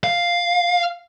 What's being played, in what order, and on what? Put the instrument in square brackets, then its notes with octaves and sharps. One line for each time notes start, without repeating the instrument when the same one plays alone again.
[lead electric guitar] F5